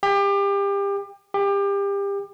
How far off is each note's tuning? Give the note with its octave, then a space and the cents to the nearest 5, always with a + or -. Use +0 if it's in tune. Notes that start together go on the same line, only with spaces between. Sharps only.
G4 +30
G4 +30